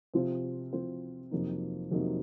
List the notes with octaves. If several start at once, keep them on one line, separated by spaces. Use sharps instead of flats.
C3 F3 C4 F4 C5
C3 F3 C4 F4 C5
F2 C3 F#3 A#3 D#4
F2 C3 F#3 A#3 D#4